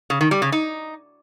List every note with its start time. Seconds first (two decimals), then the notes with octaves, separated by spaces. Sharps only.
0.10 C#3
0.21 D#3
0.31 G3
0.42 C#3
0.52 D#4